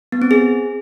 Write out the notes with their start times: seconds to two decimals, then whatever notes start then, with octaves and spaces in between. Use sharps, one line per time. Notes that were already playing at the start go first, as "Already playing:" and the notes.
0.12 B3
0.22 C4
0.31 G#4